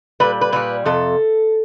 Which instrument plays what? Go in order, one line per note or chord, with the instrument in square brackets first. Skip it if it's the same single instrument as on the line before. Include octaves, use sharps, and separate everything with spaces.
[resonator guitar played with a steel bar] A#2 G3 B4
B4
A#2 G3 B4
F2 C3 A4